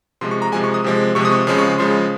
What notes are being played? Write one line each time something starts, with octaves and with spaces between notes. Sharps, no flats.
C3 F3 G#3 C6
C#6
A#5
C3 F3 G#3 G#5
C#6
D#6
C3 F3 G#3
C3 F3 G#3 C#6
D#6
C#6
C#3 F3 G#3
C#6
C#3 F3 G#3 C6